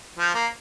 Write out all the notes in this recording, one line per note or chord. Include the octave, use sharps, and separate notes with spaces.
F3
A#3